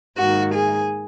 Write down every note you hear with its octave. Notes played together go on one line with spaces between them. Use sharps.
G#2 D#3 A#3 F#4
G#4